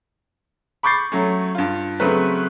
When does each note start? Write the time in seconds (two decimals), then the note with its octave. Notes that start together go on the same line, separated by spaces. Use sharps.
0.83 B5 C#6 D6 G6 A6 C7
1.12 F#3 A3 C#4
1.55 G2 F4
2.00 C#3 F#3 A3 C4 B4